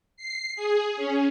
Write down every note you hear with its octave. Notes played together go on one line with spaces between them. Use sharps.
C7
G#4
C#4